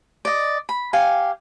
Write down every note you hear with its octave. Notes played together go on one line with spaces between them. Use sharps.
D5 D#5
B5
G4 F5 G#5